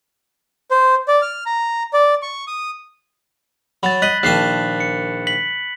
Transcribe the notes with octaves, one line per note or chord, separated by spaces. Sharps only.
C5
D5
F6
A#5
D5
C#6
D#6
F#3 B5 A6
D#5 F#6 B6 F#7
A#1 D#3 A5 F#6 C7
C#7
B6 F#7